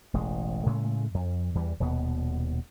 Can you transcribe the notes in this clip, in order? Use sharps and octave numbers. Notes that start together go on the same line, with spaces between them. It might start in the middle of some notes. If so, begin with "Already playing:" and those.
E1 A1 G#3
A2 C#3 G#3 A3
F2
E2 E3 G3
D#1 D#2 B2 B3